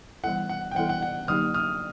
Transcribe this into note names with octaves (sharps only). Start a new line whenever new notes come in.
E3 G3 B3 E4 A4 F#5
F#5
G5
E3 G3 B3 E4 A4 F#5
F#5
F#5
D3 F#3 A#3 D#4 G4 D#6 F6
D#6 F6